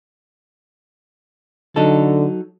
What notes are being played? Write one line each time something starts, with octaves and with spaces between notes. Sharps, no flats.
D3 F#3 D#4 A4